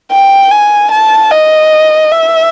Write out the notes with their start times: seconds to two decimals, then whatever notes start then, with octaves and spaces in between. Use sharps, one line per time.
0.12 G5
0.51 G#5
0.91 A5
1.31 D#5
2.11 E5